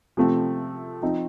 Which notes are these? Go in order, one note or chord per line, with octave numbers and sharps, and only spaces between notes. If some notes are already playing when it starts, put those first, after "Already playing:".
C3 F3 A3 C4
F3 C4 D#4